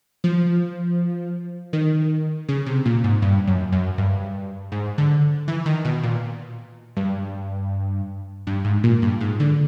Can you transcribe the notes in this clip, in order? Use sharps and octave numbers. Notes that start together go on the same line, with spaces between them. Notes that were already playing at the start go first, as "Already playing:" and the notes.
F3
D#3
C#3
C3
A#2
G#2
G2
F#2
F#2
G2
G#2
D3
E3
D#3
B2
A#2
G2
G2
G#2
A#2
G2
G#2
D3